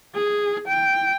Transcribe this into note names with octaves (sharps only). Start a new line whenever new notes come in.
G#4
G5